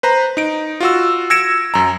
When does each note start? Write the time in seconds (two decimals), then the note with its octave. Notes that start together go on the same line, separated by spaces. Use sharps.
0.03 B4 C5 A#5
0.37 D#4 D7
0.80 F4 F#4 E6
1.30 E6 G#6 A#6 C#7 D7 E7
1.74 F#2 A#5